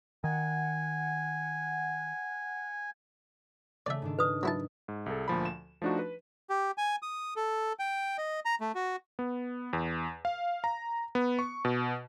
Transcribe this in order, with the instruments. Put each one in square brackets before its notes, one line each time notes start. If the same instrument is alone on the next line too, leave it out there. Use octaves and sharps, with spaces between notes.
[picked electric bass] D#3 [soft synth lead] F#5 [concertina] G#5
[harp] C#3 A3 [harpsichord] D5 E5
[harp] G#2 D#3 D4
[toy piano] B4 D#6
[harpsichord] F#3 E4 A5
[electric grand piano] G#2
C2 G#4 A4
D2 A#2 F3 B5
E7
F3 A3 D4 D#4 F#4
B4
[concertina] G4
G#5
D#6
A4
G5
D#5
A#5
A3
F#4
[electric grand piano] B3
E2
F5
A#5
B3
C#6
B2